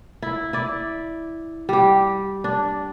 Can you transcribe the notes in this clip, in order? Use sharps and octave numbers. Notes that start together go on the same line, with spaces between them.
E4
E4 D5
G3 G4
D4